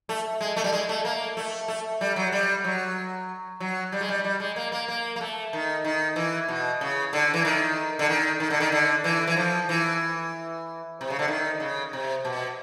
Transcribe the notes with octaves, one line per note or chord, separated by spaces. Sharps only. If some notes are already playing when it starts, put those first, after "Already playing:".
A3
G#3
A3
G3
G#3
A3
A#3
A3
A3
G3
F#3
G3
F#3
F#3
G3
G#3
G3
G3
G#3
A#3
A#3
A#3
A#3
A3
D#3
D#3
E3
B2
C#3
D3
E3
D#3
D3
D#3
D#3
D3
D#3
D3
E3
E3
F3
E3
C3
C#3
D3
D#3
C#3
C3
B2